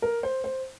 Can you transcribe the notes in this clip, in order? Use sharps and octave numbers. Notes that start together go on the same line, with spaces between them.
A#4
C5
C5